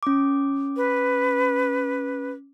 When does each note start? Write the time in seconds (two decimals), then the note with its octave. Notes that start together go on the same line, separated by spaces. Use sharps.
0.03 C#4 D6
0.77 B4